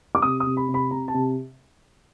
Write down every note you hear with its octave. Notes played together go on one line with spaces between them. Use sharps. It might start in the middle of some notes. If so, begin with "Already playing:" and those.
D6
C3 D#6
D#6
C3
B5
C3
B5
C3 A#5
A5
C3